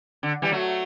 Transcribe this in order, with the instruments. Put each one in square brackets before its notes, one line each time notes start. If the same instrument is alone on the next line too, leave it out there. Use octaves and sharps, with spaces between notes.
[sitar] D3
E3 G3
F#3 A3